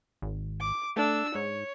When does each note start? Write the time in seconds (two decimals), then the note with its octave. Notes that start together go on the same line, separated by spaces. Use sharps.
0.22 G#1
0.60 D6
0.97 A3 D4 E6
1.35 G#2 C#5